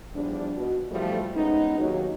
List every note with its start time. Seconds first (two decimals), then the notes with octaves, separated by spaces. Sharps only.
0.14 E2 F3 G3 D4
0.57 B2
0.91 B2 E3 F3 G3 A3
1.36 G#3 B3 C#4 D#4
1.79 D#2 F#3